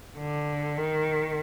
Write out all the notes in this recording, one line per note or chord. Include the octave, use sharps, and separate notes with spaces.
D3
D#3